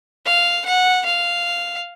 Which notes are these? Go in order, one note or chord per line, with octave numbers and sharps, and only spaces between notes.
F5
F#5
F5